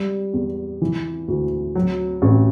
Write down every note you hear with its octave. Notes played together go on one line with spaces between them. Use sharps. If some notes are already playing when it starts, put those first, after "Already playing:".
Already playing: G3
E2
E3
D2
F#3
A1